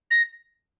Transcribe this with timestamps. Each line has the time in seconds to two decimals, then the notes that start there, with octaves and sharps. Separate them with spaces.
0.11 A#6